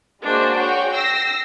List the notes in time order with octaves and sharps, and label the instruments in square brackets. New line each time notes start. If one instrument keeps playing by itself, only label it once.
[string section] G#3 A#3 F#4 [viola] D4 C5
[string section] F#4 G#4 C#5 [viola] G5
[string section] E6 A#6 C7